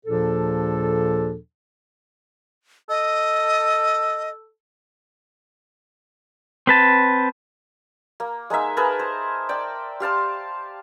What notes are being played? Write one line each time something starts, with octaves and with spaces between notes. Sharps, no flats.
D#2 A#2 F3 D4 G#4 A4
A4 D#5
C4 B4 A5
A#3
G#3 A#3 D#4 E5
G#4 A#4 B4 A5
C5
D5 G5
G4 F5 A5 C6